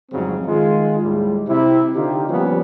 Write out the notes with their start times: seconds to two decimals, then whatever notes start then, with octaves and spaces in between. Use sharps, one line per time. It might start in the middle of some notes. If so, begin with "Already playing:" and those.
0.11 F2 G#2 C#3 F#3 G3 C4
0.45 D#3 G#3 F4
1.00 D#2 A2 G3 G#3
1.47 C3 E4
1.94 D3 D#4 F4 G4
2.28 F3 G3 A#3 B3 C#4 F4